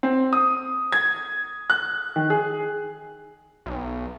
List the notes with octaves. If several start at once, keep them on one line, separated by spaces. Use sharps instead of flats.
C4
D#6
G#6
F#6
D#3
G#4
B1